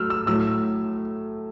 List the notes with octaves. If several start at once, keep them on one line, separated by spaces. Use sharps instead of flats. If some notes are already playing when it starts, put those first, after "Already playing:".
Already playing: F#3 A3 E6 F6
E6
A2 F#3 A3 E6